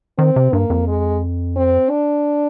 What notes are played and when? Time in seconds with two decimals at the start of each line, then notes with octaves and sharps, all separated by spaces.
0.18 D#3 C4
0.36 C3
0.53 G2 A#3
0.70 F2
0.88 G#3
1.56 C4
1.90 D4